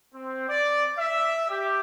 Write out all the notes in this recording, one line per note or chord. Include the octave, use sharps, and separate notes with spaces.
C4
D5
E5
G4